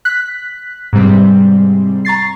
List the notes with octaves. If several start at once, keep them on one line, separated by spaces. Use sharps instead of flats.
F#6 B6
G#2 C3 G3 C4
A#5 C#6 A6 C7